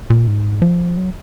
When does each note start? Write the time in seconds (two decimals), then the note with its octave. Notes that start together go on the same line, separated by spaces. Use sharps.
0.10 A#2
0.27 G#2
0.62 F3
0.97 F#3